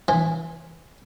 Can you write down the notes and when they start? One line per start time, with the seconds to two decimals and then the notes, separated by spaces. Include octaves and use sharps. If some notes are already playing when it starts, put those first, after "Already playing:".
0.08 E3